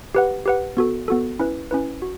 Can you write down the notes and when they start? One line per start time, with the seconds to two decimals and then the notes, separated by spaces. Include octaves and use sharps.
0.15 G4 B4 F#5
0.46 G4 B4 F#5
0.77 B3 F#4 A4
1.08 B3 F#4 A4
1.39 C#4 E4 B4
1.71 C#4 E4 B4
2.02 F#4